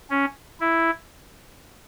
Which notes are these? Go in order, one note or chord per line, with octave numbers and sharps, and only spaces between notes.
C#4
E4